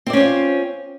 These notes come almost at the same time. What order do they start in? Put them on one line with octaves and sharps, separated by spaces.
C4 D5 C#4 C5 F4